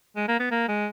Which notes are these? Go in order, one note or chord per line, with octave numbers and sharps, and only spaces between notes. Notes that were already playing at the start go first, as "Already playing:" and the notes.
G#3
A#3
B3
A#3
G#3